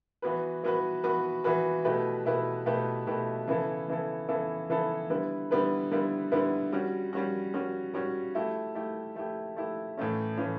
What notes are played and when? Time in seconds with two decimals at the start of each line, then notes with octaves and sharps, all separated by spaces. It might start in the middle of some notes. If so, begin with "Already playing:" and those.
0.22 E3 B3 F#4 B4
0.63 E3 B3 F#4 B4
1.04 E3 B3 F#4 B4
1.44 E3 B3 F#4 B4
1.85 B2 A3 E4 G4 B4
2.26 B2 A3 E4 G4 B4
2.66 B2 A3 E4 G4 B4
3.07 B2 A3 E4 G4 B4
3.48 C#3 E3 B3 E4 A4
3.88 C#3 E3 B3 E4 A4
4.29 C#3 E3 B3 E4 A4
4.70 C#3 E3 B3 E4 A4
5.10 D3 G3 B3 E4 B4
5.51 D3 G3 B3 E4 B4
5.91 D3 G3 B3 E4 B4
6.32 D3 G3 B3 E4 B4
6.73 G3 C#4 F#4
7.13 G3 C#4 F#4
7.54 G3 C#4 F#4
7.94 G3 C#4 F#4
8.35 A3 E4 G4
8.75 A3 E4 G4
9.16 A3 E4 G4
9.57 A3 E4 G4
9.98 A2 E3 A3 C#4
10.38 A2 E3 A3 C#4